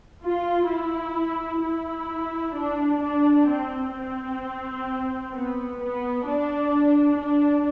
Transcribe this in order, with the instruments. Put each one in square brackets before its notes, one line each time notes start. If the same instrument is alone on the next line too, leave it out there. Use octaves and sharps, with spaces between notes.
[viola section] F4
E4
E4
D4
D4
C4
C4
B3
B3
D4
D4